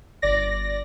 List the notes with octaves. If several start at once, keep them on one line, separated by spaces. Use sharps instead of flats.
G1 D5 A#6